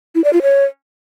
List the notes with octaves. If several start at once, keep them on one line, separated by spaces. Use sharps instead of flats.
E4
D5
F4
C#5